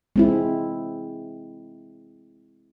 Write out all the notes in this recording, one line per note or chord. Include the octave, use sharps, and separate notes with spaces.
G#3 C4 E4